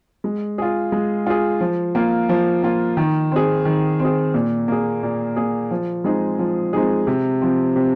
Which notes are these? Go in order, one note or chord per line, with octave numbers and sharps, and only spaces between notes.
G#3
F4 G#4
G#3
F4 G#4
F3
A#3 F4
F3
A#3 F4
D#3
C4 G#4
D#3
C4
G#4
A#2
A#3 G#4
A#2
A#3 G#4
F3
G#3 C4 D#4 G#4
F3
G#3 C4 D#4 G#4
C3
F3 C4
C3